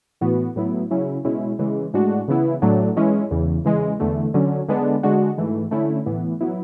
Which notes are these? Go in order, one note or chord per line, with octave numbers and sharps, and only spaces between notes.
A2 E3 B3 F#4
A2 F#3 B3 E4
C#3 F#3 C#4 E4
B2 G#3 C#4 E4
C#3 E3 G#3
A2 G#3 D4 F#4
C#3 E3 B3 E4
A2 F#3 A3 D4
E3 G#3 C#4 E4
E2 C#3 E3
C#3 E3 G#3
E2 D3 A3
D3 F#3 C#4
D3 G#3 B3 D4
D3 G#3 D4 F#4
G#2 E3 A3
D3 A3 C#4 E4
A2 E3 B3
F#3 B3 E4